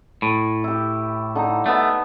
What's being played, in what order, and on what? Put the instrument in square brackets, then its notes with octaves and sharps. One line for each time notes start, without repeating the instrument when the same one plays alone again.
[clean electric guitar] A2
[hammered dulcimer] E4 G4
D3 D#4 A#5
[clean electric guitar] A3 [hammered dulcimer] B3 D#5 A5